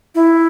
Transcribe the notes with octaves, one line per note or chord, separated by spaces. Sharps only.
E4